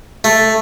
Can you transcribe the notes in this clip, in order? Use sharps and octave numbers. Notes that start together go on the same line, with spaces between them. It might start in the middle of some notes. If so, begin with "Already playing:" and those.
A3